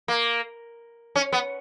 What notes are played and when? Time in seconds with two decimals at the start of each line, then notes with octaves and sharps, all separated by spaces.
0.08 A#3
1.15 C#4
1.32 B3